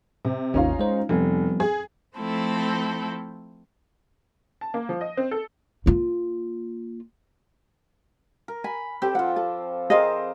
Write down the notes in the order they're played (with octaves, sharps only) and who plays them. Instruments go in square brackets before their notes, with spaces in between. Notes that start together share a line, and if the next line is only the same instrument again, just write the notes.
[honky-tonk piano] C3
[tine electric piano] G#1 D#2 [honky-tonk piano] C#4 D#4 F4
[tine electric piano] G#3 C5
[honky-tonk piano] F1 [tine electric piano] F3 G3 B3
[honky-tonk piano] G#4
[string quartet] F3 A3 C4 E4 A4
[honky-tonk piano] A5
A#3
F3
D#5
C4
A4
[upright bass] A#3 F4
[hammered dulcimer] A#4
[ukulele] G#5 [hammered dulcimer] B5
[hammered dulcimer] C4 A4 D5 [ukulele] G4
[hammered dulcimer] F3 F4 [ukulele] F#5
[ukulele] A4
[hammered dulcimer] C4 A#4 C5 [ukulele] G#4 D#5 F5